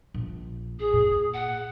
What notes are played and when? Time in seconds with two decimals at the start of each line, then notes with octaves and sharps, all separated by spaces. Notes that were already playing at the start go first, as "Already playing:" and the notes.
0.14 A#1
0.79 G#4
0.93 A#2
1.34 F#5